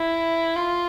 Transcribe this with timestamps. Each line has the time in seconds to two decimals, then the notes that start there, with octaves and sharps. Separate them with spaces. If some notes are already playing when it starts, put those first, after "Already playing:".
Already playing: E4
0.56 F4